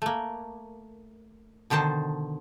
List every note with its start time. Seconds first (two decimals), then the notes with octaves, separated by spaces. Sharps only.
0.02 A3 A#3
1.70 B2 D3 D#3 C5 A5